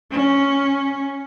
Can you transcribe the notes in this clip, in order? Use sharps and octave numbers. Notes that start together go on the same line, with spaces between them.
C#4